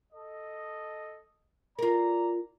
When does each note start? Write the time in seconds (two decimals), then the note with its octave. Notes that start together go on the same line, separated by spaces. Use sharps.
0.13 A4 D#5
1.79 F4 A#4 D5 A#5